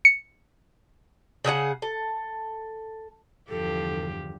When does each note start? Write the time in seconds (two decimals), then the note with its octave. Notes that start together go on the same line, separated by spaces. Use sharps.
0.05 C#7
1.44 C#3 G#4 A4 F#5
1.82 A4
3.49 E2 G2 D3 F3 G4 A4